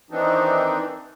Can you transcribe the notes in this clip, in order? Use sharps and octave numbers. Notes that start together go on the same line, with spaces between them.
D#3 E3 C4 D4 D#4